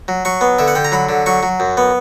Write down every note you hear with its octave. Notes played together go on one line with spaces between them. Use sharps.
F#3
F#3 C#6
B3
D3 E5
F#5
D3 G5
A#5
F#3 B5
D3
F#3 C#6
F#3
F#2
B3